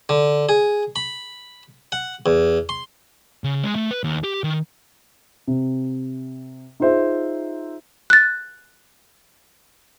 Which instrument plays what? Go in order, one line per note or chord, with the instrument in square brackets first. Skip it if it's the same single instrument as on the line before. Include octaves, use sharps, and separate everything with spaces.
[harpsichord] D3
G#4
B5
F#5
E2
C6
[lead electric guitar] C#3
G#3
A3
B4
D#2
G4
D#3
[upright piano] C3
D#4 F4 G#4 C5 E5
[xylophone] F#6 A6